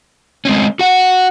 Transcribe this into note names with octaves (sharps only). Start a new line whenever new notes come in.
G#3 C4 C#4
F#4 F#5